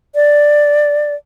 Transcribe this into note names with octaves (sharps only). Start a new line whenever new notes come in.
D5